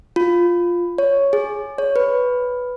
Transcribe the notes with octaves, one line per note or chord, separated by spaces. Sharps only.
F4
C#5
G#4
C#5
B4